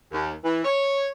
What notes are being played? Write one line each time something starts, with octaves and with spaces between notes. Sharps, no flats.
D#2
E3
C#5